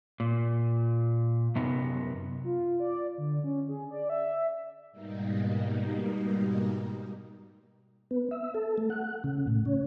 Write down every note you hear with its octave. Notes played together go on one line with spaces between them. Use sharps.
A#2
F#2 C3 B3 D#4
F4
D5
D3
C#4
G#4
D5
E5
G#2 B2 G3 A#3 D#4
B3
E5
A4
A3
F#5
C#3
A2
C#4